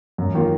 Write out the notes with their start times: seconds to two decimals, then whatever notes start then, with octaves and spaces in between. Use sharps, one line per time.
0.18 F#2
0.35 D#3 A#3 F4